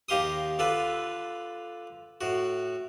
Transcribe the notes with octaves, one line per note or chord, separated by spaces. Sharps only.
D#2 D#4 G4 F5 C6 D#6
D3 F4 A4 B4
A2 F#4